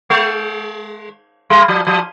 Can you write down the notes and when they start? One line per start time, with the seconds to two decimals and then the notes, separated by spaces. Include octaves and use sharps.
0.10 G#3
1.50 G3
1.68 F3
1.87 F3